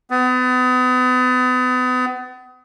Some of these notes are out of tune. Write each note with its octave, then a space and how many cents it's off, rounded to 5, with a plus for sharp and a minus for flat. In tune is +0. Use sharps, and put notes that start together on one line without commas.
B3 +35